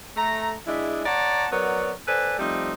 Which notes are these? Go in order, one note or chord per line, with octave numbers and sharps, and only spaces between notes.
A3 A#5
G#3 D4 E4 G#4 E5
C#5 D5 F#5 A5 A#5
F#3 B3 A#4 C#5 D5
A4 B4 C5 D5 G#5
F3 G3 A3 C4 D#4